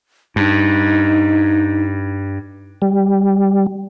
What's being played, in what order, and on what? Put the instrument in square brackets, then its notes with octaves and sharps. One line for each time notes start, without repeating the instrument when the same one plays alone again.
[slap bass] G2 [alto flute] D#4
[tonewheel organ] G3